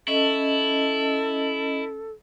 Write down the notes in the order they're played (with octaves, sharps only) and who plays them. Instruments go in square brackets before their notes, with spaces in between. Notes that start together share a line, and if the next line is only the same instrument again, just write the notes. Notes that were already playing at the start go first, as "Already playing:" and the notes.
[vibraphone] C#4 D#5 [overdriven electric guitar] E4 [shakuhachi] A4